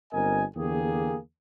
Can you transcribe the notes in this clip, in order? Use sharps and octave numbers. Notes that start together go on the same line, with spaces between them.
G1 C4 A#4 D#5 G#5
E2 D3 A#3 G4 G#4